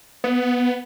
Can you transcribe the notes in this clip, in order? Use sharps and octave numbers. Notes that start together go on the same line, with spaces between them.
B3